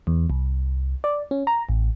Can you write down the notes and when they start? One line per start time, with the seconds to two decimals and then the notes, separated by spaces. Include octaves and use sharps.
0.07 E2
0.30 C2
1.04 D5
1.31 C#4
1.47 A#5
1.69 A1